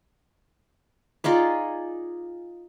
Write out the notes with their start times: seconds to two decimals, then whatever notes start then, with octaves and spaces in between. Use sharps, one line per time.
1.24 D#4 F4 G#4 D5